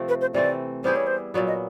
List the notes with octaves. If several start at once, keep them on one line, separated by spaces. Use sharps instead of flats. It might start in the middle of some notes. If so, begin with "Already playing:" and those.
Already playing: C3 F3 A3 C4
B4
C5
C3 E3 A3 C4 D5
G3 B3 E4 G#4 C5
C#5
C5
A#2 F#3 B3 D5
D#5